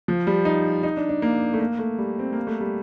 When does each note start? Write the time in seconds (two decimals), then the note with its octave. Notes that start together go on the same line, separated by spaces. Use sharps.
0.08 F3
0.27 G3
0.45 D#4
0.83 D#4
0.97 D4
1.09 D4
1.22 A#3
1.53 A3
1.60 A#3
1.79 A3
1.98 G3
2.19 C4
2.33 A#3
2.47 A3
2.61 G3